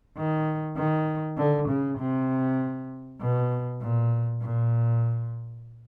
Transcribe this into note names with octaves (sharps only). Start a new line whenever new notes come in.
D#3
D#3
D3
C#3
C3
B2
A#2
A#2